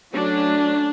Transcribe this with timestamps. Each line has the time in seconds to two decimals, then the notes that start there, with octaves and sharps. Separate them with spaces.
0.14 F#3 A3 C#4 D4